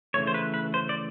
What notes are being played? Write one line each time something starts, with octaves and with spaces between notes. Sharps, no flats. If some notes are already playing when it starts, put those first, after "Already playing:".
C#3 E3 A3 C#5
C5
B4
B4
C5
D5